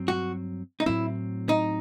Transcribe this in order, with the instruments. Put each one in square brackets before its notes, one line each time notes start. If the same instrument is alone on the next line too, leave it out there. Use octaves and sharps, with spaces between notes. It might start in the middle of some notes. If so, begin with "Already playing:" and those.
Already playing: [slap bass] G2 F#3 C4
[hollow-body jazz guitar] F#4
D#4
[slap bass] A2 F#3 C4 [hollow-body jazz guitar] E4
[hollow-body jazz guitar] D#4